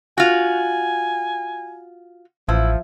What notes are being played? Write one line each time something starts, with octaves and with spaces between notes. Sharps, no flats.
F4 F#4 G#5
A1 F3 E4